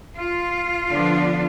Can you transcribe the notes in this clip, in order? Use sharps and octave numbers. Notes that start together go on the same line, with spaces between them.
F4
D3 F3 B3 D4